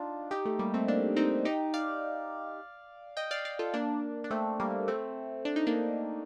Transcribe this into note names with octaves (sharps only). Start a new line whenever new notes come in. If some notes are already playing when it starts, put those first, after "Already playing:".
Already playing: D4 D#4 F4
D#4 G4
A3
G3 A#3
A3 C4
A#3 D4
C4 D#4
D#4 G4
D5 F5
D#5 G5
D5 F5
D5 F5
F4 A4
A#3 D4
D4
A3 C4
G3 A#3
A3 C4
D4
D#4
A#3 D4